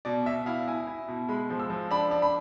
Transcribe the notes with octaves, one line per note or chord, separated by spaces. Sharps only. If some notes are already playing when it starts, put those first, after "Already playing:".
B2 D5
B2 E5
E4 F5
E4 G#5
E4
B2
G#3 B5
F3
E6
F3
D4 B5
D4
B5